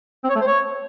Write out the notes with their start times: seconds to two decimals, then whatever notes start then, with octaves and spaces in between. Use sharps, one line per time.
0.24 C4
0.30 C#5
0.35 A3
0.41 C5
0.47 C#5